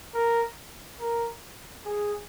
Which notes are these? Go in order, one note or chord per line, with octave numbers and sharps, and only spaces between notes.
A#4
A#4
G#4